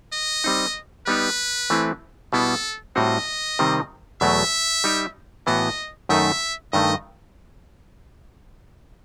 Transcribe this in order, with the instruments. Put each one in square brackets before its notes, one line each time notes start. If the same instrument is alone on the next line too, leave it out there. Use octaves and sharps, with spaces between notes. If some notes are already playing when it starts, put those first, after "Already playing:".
[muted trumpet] D#5
[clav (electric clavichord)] G3 C4 D#4
[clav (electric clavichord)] G3 B3 D#4 G4 [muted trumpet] B4
[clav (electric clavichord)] E3 A3 C4 E4
[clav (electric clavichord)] B2 G3 B3 E4 [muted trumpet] A4
[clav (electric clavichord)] A2 G3 C4 F#4 [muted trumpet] D#5
[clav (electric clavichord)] C3 D#3 G3 C4
[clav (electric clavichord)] E2 B2 F#3 A3 [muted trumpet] E5
[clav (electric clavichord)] G3 D#4 G4
[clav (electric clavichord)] A2 E3 B3 F#4 [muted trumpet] D#5
[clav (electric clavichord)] F#2 D#3 A3 D#4 [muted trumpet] E5
[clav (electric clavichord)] G2 D#3 A3 [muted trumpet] D#5